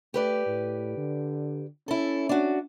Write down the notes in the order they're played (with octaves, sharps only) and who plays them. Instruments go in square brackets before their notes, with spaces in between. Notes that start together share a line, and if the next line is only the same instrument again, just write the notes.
[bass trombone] A3 [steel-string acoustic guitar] G4 B4 D5
[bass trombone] A2
D3
[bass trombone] C#4 [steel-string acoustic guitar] E4 A4
[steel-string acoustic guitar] D4 F#4